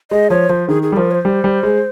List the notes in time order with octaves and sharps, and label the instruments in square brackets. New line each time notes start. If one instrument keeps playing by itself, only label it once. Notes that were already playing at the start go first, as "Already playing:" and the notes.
[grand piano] G#3 [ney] D#5
[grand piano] F3 [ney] C#5
[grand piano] F3 [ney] C5
[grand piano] D#3 [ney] G#4
[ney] G#4
[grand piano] G3
[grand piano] F3 [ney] A#4
[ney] C#5
C5
[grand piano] G3
G3
G#3